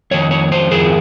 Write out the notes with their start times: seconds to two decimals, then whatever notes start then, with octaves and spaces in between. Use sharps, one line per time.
0.11 F2 D#3 C#5
0.31 C#5
0.52 C5
0.71 F2 D#3 G#4